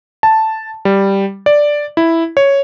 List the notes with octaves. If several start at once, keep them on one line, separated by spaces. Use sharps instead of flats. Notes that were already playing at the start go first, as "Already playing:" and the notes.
A5
G3
D5
E4
C#5